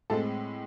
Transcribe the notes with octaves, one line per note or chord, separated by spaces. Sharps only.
A2 G#3 C4 A4